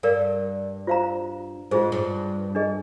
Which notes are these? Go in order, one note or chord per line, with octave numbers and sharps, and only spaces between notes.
G2 A#4 D5 F5
F4 C5 F5 A#5
G#2 F4 G#4 C5
G2
D4 G#4 D#5